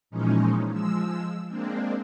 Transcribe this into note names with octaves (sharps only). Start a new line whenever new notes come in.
A#2 E3 F3 G#3 C#4 D#4
F3 G#3 E6
G#3 A#3 C4 D4